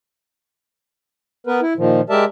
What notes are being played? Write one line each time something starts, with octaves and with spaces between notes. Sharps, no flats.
B3 A#4 B4
E4
A#2 D#3 F3
G#3 G4 A#4 D5 E5 A5